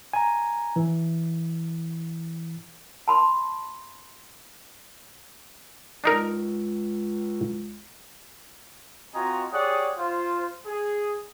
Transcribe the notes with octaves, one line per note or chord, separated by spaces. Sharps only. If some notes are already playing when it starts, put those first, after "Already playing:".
G#5 A#5
E3
A5 B5 C6
C#2 D4 D#4 A#4
C4 F4 F#4 D#5 G#5 A#5
G4 G#4 C#5 D5 F#5 D#6
F4 C5
G#4